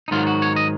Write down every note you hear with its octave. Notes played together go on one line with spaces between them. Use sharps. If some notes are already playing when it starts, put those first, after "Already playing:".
D#4
G#2 D#3 F#3 F4
F#4
C#5
D#5